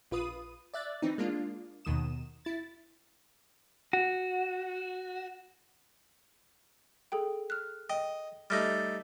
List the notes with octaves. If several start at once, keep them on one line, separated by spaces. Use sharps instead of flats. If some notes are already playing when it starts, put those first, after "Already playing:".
A#1 F4 B4 D#6 D#7
D5 E5 F#6 A6
E3 C4 D#4
G#3 A#3 D4 F4
D#2 B2 D#3 D#6 E7
E4 A6
F#4
G#4 A4 G5
F6 F#6
D#5 G5
G3 A3 D#4 F6 A#6